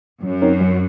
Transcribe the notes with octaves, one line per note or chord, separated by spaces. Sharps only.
F#2 F#3
C4 D#4 A#4 C#5
F#3